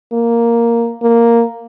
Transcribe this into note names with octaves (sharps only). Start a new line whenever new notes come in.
A#3
A#3